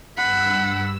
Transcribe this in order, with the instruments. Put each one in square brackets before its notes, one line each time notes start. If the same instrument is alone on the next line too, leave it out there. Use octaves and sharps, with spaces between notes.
[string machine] G2 E6 [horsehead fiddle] F#5 B5